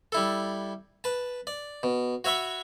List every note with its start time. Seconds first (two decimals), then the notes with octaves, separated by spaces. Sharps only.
0.12 G3 E4 A4
1.04 B4 A5
1.47 D5
1.83 B2
2.24 F#4 C#5 E5 B5 C#6